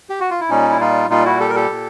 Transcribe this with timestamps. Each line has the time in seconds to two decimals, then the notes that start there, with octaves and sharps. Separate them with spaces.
0.10 G4
0.20 F#4
0.30 F4
0.40 E4
0.49 A#2 G3 C#4 D#4
0.70 E4
0.80 D#4 F4
1.10 A#2 G3 D#4 F4
1.25 E4 F#4
1.40 G4 A4
1.49 A#4
1.55 G4 A4
1.70 A#2